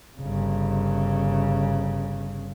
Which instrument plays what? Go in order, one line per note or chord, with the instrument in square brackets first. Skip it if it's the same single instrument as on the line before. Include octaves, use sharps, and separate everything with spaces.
[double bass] G1 C#3